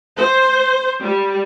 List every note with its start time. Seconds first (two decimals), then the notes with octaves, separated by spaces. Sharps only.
0.17 C5
1.02 G3